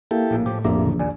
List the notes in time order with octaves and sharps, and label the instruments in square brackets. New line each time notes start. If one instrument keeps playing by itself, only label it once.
[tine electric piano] A#3 [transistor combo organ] E4 G4 A4
[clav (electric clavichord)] A#1 A2
[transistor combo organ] A2 [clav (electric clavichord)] F3 G4
[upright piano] A#1 [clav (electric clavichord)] F2 A#3 A#5 [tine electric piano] G4 E5 D6
[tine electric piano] C#3 E3
[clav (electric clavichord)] D#2 A#2 [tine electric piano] D5 G#5